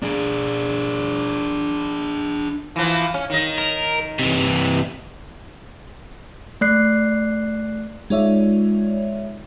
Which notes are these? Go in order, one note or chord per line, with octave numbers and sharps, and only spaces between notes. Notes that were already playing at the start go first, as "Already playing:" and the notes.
D4 G#4
E3 F3
C#4
D#3 D#5
A#4
C3 E3
A3 D5 F#6 C7
G#3 D#4 F4 C#5 D5 E5